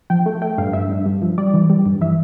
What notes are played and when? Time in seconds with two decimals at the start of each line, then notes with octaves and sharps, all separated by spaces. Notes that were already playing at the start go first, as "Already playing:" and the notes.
0.10 F3 G5
0.26 A3
0.42 A3 G5
0.58 G2 F5
0.73 G2 E5
0.89 G2
1.06 G2
1.22 F3
1.38 G3 D5
1.54 E3
1.70 G3
1.86 G2
2.01 E3 E5